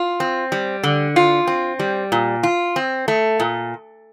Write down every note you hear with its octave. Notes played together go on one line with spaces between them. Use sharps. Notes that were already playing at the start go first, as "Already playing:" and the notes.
Already playing: F4
C4
G3
D3
F4
C4
G3
A#2
F4
C4
A3
A#2